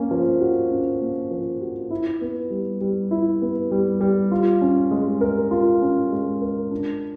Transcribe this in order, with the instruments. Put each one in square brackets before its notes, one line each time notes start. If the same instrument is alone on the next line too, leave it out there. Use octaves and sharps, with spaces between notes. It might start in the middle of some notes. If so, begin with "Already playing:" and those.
Already playing: [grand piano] A#3 C#4
F3
F#4
C#4
A#3
F3
F#4
E4
B3
G3
G3
E4
B3
G3
G3
F4
C#4
G#3
A#4
F4
C#4
G#3
A#4
D4